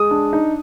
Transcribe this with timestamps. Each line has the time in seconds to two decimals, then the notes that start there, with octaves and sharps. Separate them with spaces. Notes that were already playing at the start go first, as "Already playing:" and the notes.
Already playing: G#3 D#6
0.11 D4
0.33 D#4